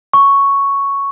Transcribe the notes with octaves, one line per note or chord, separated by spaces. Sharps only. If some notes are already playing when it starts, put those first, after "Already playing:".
C#6